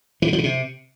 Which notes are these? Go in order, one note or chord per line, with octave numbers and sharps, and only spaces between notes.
E3
C#3
F3
C#3
C3